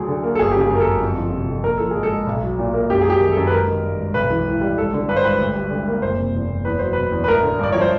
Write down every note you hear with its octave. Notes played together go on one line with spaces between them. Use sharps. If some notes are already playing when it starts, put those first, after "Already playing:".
Already playing: D2 F#3 G#4
D3
A#3
A4
G1 G#4
G4
C#3
G#4
F#2
A#4
A4
G1
F2
F3
C3
F2
A#1 A#4
F3 A4
G#4
G#2
A4
G#3
B1
F#3
A#2
A#3
F#2 G4
G#4
F#3 G4
D#3
A4
F#2
B4
G#1 A#4
D#3
G2
G#1
B1 B4
E3
A2
G3
G#1 A4
D3
G2 B4
C5
G#1 B4
D2
G3
D3
A#3
F#1 C5
C3
E2
F#1
E2 B4
F#3 C5
B2 B4
E2
B4
A1 A#4
D3
G2 D5
F3 C#5
C5